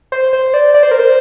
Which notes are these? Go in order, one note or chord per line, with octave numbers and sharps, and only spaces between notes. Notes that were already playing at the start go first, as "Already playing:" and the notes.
C5
C5
D5
D5
C5
A#4
C5